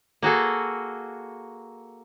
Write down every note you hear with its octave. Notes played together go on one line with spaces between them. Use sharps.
A#3 F#4 G#4 A4